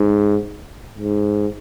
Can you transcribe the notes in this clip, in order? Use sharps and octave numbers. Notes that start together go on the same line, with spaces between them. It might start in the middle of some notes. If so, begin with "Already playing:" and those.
Already playing: G#2
G#2